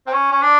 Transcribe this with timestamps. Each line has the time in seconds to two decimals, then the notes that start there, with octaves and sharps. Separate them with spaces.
0.07 C4
0.13 C#4
0.32 C#4
0.42 D4